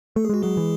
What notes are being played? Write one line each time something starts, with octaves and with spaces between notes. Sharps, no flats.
A3 A4
G#4
G#3 F#4
F#3 G#3 G#4
E3